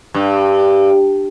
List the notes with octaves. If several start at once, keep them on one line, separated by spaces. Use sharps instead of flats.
G2